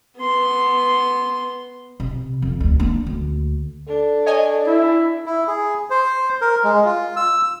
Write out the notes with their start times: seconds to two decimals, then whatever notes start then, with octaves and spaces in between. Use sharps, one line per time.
0.21 B3 C6
2.00 C3
2.42 F2
2.60 D2
2.80 A#3 D4
3.06 D2
3.88 D4 A4
4.26 C#5 D#5 G#5
4.67 E4
5.26 E4
5.48 G#4
5.90 C5
6.41 A#4
6.64 G#3
6.85 F4
7.16 E6